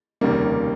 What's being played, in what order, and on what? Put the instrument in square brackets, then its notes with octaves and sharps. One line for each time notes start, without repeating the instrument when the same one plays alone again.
[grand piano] F1 D#2 C#3 G3 A#3